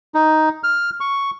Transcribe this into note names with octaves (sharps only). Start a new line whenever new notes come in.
D#4
F6
C#6